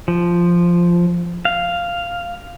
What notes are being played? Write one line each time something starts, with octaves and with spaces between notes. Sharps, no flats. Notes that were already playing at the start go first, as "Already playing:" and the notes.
F3
F5